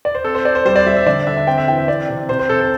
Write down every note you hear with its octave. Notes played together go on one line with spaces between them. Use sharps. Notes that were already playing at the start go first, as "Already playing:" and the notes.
D5
C5
C4 A4
C5
C4 D5
C5
G3 C5
D5
G3 E5
E5
D3 D5
D3 E5
E5
C4 G5
E5
E3 G5
E5
C4 D5
C3
C3 C5
C5
C3 A4
A4